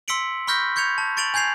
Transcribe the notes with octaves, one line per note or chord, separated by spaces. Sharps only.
C6 E6 B6 C#7 D7 F#7
B5 C#6 F6 G6 A#6 B6
C#6 G6 G#6 C#7 F7
A5
C#6 A6 D7 F7 F#7
G#5 G6 G#6 C7 F7